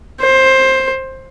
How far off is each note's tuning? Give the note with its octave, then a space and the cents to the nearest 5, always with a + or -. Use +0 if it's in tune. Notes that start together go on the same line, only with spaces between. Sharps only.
C5 +15